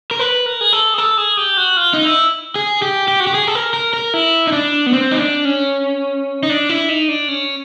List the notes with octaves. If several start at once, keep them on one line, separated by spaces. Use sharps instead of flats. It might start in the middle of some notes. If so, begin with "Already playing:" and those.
A#4
B4
A#4
G#4
A4
G#4
A4
G#4
G4
F#4
F4
D#4
E4
G#4
G4
G4
F#4
G4
G#4
A4
A#4
A#4
A#4
E4
D#4
D4
B3
C4
D#4
D4
C#4
D#4
D4
E4
D#4
D4
C#4